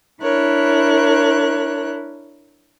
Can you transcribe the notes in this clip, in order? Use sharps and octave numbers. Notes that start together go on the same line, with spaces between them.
D4 E4 A#4 C#5 F#6